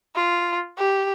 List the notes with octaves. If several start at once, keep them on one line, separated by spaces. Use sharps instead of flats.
F4
G4